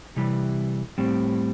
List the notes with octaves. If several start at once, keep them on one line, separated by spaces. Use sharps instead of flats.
C3 E3 G3
A2 G3 C4